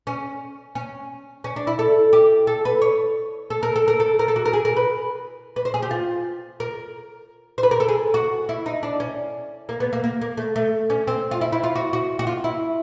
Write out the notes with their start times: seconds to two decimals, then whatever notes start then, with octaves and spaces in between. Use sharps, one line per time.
0.07 C#4
0.75 C#4
1.44 C#4
1.56 D4
1.67 E4
1.79 A4
2.13 G4
2.47 A4
2.65 B4
2.82 C#5
3.50 A4
3.63 A#4
3.76 A4
3.88 A#4
4.00 A4
4.19 A#4
4.28 A4
4.36 F#4
4.45 A#4
4.53 G#4
4.65 A#4
4.77 B4
5.56 B4
5.65 C5
5.74 G#4
5.82 G4
5.91 F4
6.60 A#4
7.58 C5
7.63 B4
7.71 A#4
7.80 A4
7.88 G#4
8.14 F#4
8.49 E4
8.66 D#4
8.83 D4
9.00 C#4
9.69 A#3
9.80 B3
9.93 A#3
10.04 A#3
10.21 A#3
10.37 A3
10.56 A3
10.90 C#4
11.07 C4
11.31 F4
11.41 E4
11.52 E4
11.64 F4
11.76 F#4
11.93 F#4
12.19 F#4
12.27 F4
12.44 E4